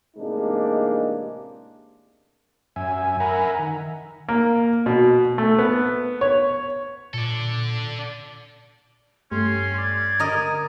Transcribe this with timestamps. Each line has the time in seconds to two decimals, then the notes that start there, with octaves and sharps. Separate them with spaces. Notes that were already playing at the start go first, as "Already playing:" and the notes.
0.17 A1 C3 G#3 A#3 D4 D#4
2.76 F#2 E5 G#5
3.20 A#4 E5 F#5 G#5 A#5 B5
3.59 D#3
4.29 A#3
4.86 B2
5.38 A3
5.59 B3
6.21 C#5
7.14 A#2 A4 D5
9.31 G2 A3 C#4 G4 C6
9.78 D5 G#6
10.19 D3 A#4 D#5